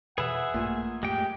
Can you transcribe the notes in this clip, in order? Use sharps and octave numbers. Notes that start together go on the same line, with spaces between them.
F2 B2 E3 G#4 B4 E5 F#5
A#1 G2 A#2 A3
F2 A2 G#3 A3 G4 G5